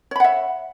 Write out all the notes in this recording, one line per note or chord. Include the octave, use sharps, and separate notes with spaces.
C#5 E5 F#5 B5